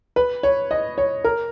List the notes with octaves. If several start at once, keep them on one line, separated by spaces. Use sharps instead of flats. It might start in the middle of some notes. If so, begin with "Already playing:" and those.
B4
C#5
D#5
C#5
A#4